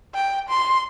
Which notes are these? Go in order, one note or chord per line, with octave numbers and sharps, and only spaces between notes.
G5
C6